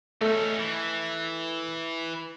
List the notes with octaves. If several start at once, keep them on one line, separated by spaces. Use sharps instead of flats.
A3 C#4 D#4
E3